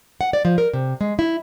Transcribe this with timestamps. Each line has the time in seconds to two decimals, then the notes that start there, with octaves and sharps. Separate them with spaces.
0.21 F#5
0.33 D5
0.45 F3
0.58 A#4
0.73 C3
1.01 G#3
1.19 E4